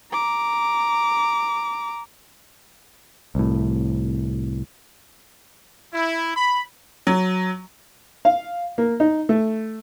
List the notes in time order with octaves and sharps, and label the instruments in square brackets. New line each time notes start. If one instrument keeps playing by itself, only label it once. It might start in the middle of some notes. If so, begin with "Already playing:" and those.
[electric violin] A#5 D6
[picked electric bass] C2 A2
[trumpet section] E4
B5
[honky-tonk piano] F#3
[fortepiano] F5
A#3
D#4
A3